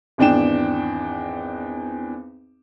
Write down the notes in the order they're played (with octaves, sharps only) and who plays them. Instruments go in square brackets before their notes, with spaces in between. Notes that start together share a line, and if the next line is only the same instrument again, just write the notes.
[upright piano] G#1 E2 D4 G5 E7